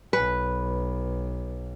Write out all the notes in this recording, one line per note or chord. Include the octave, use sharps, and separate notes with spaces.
B1 B4